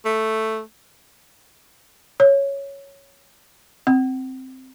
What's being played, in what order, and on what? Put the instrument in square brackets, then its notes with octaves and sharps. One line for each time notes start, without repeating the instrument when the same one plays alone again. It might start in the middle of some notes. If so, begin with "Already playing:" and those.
[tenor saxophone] A3
[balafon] C#5
C4